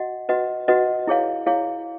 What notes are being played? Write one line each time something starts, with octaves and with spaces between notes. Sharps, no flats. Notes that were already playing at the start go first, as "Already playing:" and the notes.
Already playing: F#4 D#5 F#5
F#4 B4 D#5 F#5
F#4 B4 D#5 F#5
E4 G#4 C#5 F5
E4 G#4 C#5 F5